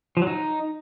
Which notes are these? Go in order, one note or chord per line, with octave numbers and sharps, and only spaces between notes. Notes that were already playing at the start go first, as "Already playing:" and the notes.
F3
F#3
D#4